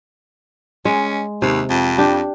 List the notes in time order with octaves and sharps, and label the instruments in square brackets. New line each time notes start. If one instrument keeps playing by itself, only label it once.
[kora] G#3 [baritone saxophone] C#4
[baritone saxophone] D#2 [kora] C3
[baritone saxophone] F2
[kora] D4 G4